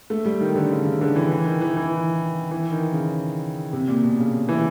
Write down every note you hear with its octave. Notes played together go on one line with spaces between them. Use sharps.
A3
G3
D#3
D3
C#3
C#3
D3
E3
E3
D#3
E3
E3
E3
D#3
C#3
C3
A#2
B2
C#3
E3